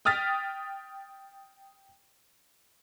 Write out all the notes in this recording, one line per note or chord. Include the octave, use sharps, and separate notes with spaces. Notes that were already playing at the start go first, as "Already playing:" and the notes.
G5 D#6 F6 A6 B6